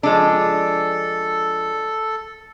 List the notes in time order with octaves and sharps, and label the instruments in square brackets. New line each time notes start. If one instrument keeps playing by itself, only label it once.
[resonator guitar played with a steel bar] F3 G#3 D4 [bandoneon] A4